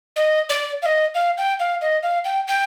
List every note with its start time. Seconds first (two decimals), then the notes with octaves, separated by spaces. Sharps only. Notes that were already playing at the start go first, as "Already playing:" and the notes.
0.16 D#5
0.49 D5
0.82 F5
0.86 D#5
1.15 F5
1.38 G5
1.60 F5
1.81 D#5
2.03 F5
2.25 G5
2.48 G5